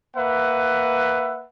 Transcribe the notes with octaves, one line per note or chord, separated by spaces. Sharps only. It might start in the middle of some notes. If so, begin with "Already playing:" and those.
A#3 B4 E5 F#5